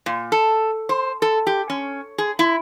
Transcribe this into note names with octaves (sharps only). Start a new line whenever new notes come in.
A#2
A4
C5
A4
G4
C#4
G#4
E4